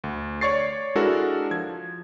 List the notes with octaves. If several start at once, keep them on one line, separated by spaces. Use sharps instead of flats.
D2
C#5 D5 C#6 A6 C7
G#3 D4 E4 F#4 A4 A#4
F3 G#6